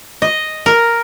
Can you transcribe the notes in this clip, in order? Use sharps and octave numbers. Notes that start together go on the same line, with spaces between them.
D#5
A#4